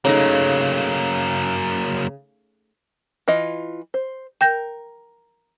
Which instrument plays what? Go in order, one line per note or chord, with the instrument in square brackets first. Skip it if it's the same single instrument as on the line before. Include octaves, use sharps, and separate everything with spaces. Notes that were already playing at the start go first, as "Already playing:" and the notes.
[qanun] C#3 A3 D#4 [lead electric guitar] F#3 A#3
[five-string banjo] E3 F4 D#5
C5
[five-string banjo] A#4 [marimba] G5 G6 A#6